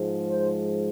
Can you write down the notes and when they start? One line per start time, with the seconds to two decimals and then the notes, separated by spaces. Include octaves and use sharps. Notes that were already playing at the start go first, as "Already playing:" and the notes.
Already playing: G#2 F3 G#3
0.31 C5